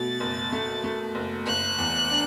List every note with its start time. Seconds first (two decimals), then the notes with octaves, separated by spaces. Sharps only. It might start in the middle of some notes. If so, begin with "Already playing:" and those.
Already playing: B2 A3 A6
0.20 F#1
0.52 A3
0.84 A3
1.15 F#1
1.47 F#1 F#6
1.78 E2
2.10 D4